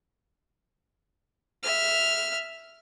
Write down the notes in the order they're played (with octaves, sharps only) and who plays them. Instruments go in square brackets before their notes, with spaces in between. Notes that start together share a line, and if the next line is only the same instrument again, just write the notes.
[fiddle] E5 F6